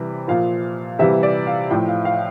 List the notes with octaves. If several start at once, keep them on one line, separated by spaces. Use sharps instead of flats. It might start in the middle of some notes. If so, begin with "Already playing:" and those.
Already playing: C3 E3 G3
A#2 F3 F5
C3 E3 G3 E5
D5
F5
A2 F3 G5
F5
F5